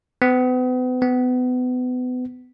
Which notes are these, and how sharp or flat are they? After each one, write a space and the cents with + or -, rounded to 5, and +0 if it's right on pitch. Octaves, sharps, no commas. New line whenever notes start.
B3 +40
B3 +30